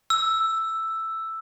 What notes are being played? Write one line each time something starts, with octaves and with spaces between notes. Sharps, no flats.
E6